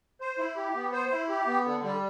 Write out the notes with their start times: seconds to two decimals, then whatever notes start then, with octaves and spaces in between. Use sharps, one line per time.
0.21 C5
0.38 E4
0.56 G4
0.75 B3
0.92 C5
1.11 E4
1.29 G4
1.47 B3
1.65 D3
1.83 G3